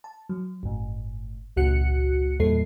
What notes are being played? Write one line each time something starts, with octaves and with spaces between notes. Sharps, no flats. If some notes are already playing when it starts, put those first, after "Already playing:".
A5
F#3
G1 A2
G#1 C#2 A#2 F#4 F#6 C#7
E2 A#2 G3 A4 C7